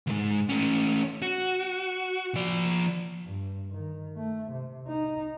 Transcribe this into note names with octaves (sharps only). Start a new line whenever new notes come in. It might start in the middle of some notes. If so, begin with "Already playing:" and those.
D2 G#2
A3 C#4
F#4
F3 D5
G2
D#3
A3
C3
D#4